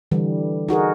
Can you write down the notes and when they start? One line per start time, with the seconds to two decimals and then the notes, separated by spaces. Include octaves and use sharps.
0.11 D3 E3 G3
0.69 D#4 F#4 G#4 A#4